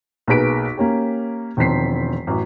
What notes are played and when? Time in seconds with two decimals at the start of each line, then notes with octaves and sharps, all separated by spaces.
0.27 B1 A#3 G#4 B4 B6 D7
0.78 A#3 C#4 G4
1.57 E1 D#3 F3 C4 B6 C7
2.27 A1 F#2